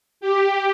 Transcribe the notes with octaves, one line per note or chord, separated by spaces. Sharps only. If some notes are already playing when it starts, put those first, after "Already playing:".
G4